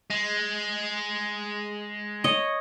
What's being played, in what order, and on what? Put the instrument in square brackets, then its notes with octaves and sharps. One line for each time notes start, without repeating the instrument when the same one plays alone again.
[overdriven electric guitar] G#3
[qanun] C#5 D#5